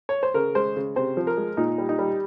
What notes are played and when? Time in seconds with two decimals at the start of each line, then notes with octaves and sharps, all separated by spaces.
0.09 C#5
0.23 C5
0.34 C#3 A#4
0.55 G#3 C5
0.76 C#3
0.96 C3 C5
1.17 F3
1.27 A#4
1.37 G#3
1.57 A#2 D#4
1.78 G3
1.89 D#4
1.99 G3